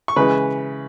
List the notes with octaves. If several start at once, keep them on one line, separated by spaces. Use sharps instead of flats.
C#6
C#3 E3 G#3 B4 B5